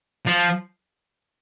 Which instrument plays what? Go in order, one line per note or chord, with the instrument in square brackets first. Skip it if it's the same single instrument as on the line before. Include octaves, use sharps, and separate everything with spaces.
[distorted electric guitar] F3